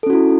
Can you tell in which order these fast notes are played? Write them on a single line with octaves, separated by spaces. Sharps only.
A4 C#4 F#4 E4